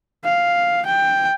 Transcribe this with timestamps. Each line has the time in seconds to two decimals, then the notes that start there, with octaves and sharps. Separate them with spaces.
0.24 F5
0.86 G5